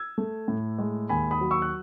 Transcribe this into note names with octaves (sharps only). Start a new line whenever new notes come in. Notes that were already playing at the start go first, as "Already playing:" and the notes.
Already playing: E6 G#6
A3
A2
G#3
D#2 G#5 B5
B5 D#6
F#3
C#6 E6
F#6